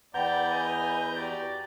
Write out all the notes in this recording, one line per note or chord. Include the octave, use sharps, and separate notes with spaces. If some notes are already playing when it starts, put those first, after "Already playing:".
E2 B4 D5 F#5 G5 A#5 G6
D#5 G#5
F#4 G4 D5